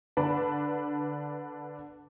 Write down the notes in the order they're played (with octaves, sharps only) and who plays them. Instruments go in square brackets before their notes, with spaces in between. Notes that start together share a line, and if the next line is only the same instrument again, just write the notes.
[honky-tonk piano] D3 D4 B4